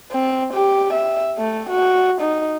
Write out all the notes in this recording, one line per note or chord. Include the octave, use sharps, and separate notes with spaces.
C4
G4
E5
A3
F#4
D#4